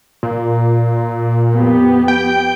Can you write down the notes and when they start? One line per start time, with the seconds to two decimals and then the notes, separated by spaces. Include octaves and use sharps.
0.23 A#2
1.55 F2 B3 G4
2.08 G5